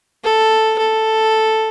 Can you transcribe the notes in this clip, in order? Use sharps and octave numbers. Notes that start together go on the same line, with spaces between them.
A4
A4